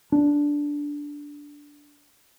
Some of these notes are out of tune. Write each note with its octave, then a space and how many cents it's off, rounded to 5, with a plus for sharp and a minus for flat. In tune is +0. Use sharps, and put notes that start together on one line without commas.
D4 -10